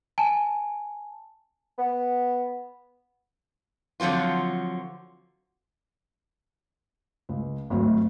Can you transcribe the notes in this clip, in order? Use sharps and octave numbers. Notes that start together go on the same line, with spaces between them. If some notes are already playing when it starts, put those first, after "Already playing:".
G#5 A5
B3
D3 F3 F#3 C4 F4
C#2
G#1 D2 F#3